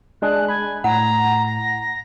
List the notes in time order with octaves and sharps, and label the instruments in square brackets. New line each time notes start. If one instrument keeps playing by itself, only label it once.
[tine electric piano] G#3 D4 G#4 [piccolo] F#6
[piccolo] G#5 [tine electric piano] B5
[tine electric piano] A2 [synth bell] F#5 [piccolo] A#5
[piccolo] A#6